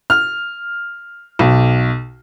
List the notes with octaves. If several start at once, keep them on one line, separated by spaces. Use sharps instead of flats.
F6
B1